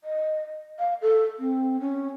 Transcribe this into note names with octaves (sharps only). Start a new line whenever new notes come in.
D#5
F5
A4
C4
C#4